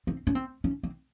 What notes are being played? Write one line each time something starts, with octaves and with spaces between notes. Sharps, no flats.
C4
C#4
C4
C#4
C4